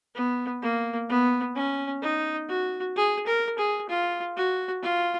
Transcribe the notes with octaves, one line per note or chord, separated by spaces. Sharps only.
B3
A#3
B3
C#4
D#4
F#4
G#4
A#4
G#4
F4
F#4
F4